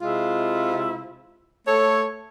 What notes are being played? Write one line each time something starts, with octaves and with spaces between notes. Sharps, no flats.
C3 G#3 E4 F4
A3 A4 C#5